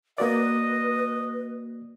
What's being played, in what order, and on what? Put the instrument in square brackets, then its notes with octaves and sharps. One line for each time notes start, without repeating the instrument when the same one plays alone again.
[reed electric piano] A#3 F#4 D5 [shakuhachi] B4 [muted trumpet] D#5